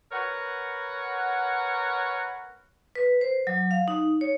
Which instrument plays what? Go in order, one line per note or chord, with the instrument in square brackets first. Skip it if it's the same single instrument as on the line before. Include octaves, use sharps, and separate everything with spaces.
[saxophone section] A#4 B4 C#5 F#5
[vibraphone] B4
C5
F#3
F5
D#4
C#5